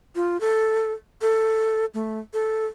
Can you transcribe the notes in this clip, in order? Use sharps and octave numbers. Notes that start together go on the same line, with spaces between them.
F4
A4
A4
A3
A4